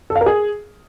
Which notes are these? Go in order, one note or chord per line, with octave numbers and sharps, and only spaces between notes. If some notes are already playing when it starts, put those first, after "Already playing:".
A4
F5
A#4
G#4